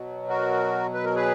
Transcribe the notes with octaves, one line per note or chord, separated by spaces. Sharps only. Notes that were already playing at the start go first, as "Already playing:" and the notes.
Already playing: B2 F#3
F#4 A#4
B4
A#4
G#4 B4